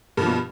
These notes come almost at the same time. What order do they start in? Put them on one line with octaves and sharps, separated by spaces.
G2 F3 B2